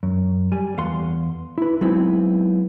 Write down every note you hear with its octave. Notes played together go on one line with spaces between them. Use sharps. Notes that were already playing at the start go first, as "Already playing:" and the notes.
F#2
G3 G#5
E2 F5 F#5 C6
E4 B4
F#3 G#3 B3 C4 D#4 E4